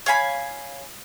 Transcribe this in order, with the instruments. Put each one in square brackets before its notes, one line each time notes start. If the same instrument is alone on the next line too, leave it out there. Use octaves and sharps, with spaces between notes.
[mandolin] C#5 F5 G#5 B5